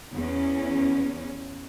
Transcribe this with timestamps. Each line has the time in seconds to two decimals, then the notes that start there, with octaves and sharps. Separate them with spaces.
0.14 E2 C#4